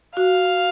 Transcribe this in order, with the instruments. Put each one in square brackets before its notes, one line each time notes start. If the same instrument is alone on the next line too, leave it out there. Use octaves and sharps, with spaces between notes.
[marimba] F#4 [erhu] F5